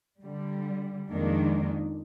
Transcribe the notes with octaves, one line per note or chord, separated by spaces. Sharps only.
D3 G3
F2 D#3 G#3 A#3 D4